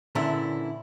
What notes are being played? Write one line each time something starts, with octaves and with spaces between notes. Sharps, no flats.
A#2 D3 E3 C#4 D4 E4